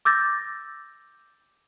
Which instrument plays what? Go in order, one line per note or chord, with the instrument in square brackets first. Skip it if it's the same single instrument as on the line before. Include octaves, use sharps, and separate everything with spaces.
[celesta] D6 E6 G6 A6 A#6